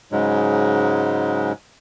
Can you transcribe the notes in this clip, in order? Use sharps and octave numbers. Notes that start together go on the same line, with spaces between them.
G#2 C#3 F#3 G#3